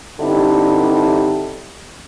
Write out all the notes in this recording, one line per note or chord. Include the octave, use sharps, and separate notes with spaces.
G2 D3 C4 D#4 E4 G4